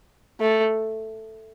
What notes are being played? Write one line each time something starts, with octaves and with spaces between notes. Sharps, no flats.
A3